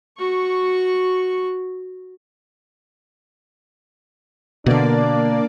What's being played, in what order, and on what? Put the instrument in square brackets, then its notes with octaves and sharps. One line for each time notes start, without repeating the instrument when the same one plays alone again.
[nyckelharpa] F#4 C#6
[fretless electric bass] B2 D3 [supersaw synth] A#3 D5 [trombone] D4